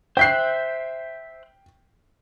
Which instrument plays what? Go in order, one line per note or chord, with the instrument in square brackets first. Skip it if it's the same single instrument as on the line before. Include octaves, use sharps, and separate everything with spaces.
[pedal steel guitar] C5 E5 F#6 [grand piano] G5 G6 C7